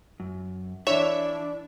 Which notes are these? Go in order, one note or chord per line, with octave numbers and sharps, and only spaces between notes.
F#2
E3 D4 E4 C#5 E5